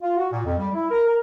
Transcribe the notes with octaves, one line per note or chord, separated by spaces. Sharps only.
F4
F#4
A#2
F2
G3
E4
A#4
A#4